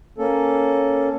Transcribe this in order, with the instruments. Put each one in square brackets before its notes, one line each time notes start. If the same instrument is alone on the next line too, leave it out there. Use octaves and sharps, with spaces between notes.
[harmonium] A#3 C#4 A4